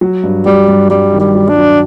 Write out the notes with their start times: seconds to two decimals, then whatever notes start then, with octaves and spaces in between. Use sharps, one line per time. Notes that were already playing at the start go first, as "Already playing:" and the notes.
0.01 F#3
0.24 G2
0.46 F#3 G3
0.68 G2
0.90 G2 G3
1.13 D#3
1.20 G3
1.35 F#3
1.49 D4
1.57 F#3